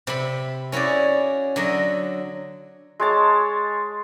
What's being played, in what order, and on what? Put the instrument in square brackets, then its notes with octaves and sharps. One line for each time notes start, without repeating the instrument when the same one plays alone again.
[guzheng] C3 E5 B5
C#4 E4 F#4 G#4 D5
D3 F#3 D#5 E5
[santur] G#3 C#5 A5